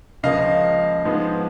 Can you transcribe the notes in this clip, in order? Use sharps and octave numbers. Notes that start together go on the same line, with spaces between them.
C#2 C#3 F3 A#3 D#5 F5
G#2 F3 G#3 B3